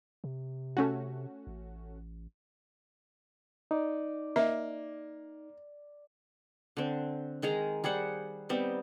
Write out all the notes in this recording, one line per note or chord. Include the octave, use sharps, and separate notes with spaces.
C3
A3 C#4 F#4
A1
D#4 D5
A#3 D#5 E5
D3 C4
D#3 G#3 G#4 A#5
G3 G#4 C5 F#5
G3 B3 C4 D#4